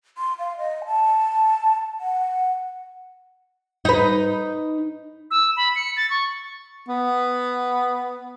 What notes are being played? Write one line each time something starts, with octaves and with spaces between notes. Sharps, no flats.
C6
F5
D#5
A5
F#5
D#4 B4
E6
B5
C#7
A6
C#6
B3